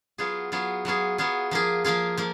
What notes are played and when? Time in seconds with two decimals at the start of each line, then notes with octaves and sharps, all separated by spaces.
0.18 F#3 B3 F4 G#4
0.52 F#3 B3 F4 G#4
0.85 F#3 B3 F4 G#4
1.18 F#3 B3 F4 G#4
1.51 F3 A#3 F4 G#4
1.84 F3 A#3 F4 G#4
2.17 F3 A#3